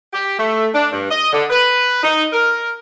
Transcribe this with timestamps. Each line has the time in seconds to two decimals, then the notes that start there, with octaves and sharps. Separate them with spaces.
0.13 G4
0.38 A3
0.74 D4
0.92 G2
1.10 D#5
1.33 D3
1.50 B4
2.03 D#4
2.33 A#4